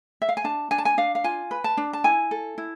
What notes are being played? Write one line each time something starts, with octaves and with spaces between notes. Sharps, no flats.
E5
F5
G#5
D4 A5
D4 G#5
A5
G#5
D4 F5
F5
F4 G#5
B4
A5
D4
A5
E4 G#5
A4
E4